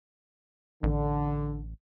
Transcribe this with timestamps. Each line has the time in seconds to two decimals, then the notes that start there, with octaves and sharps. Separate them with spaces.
0.83 A1 D3